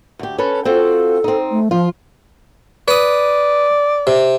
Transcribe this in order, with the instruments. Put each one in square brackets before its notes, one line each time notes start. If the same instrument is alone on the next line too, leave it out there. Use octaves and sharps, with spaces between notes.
[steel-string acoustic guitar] D2 G4
C#4 A4 B4
[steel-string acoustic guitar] C4 F4 F#4 [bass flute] A4
[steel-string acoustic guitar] C4 D#4
[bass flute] A3
[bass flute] F3 [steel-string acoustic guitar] F4
[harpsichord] B4 D#6 [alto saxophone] D5
[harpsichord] C3